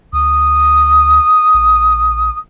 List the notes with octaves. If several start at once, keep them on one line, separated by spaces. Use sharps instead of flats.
D2 D#6
A#1